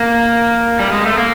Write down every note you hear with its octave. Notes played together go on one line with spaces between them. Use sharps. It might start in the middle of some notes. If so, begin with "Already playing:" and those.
Already playing: A#3
G3
G#3
A3
A#3